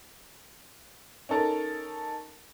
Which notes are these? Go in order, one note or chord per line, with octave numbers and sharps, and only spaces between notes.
C#4 D#4 A4 A#4